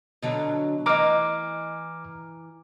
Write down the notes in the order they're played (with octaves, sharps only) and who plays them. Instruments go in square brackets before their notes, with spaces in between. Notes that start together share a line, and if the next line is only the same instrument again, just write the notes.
[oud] B2 D3 F#3
[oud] E3 D#5 [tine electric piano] A#5 D6 F6